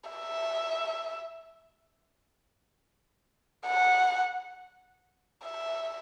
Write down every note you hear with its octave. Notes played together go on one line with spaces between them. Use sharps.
E5
F#5
E5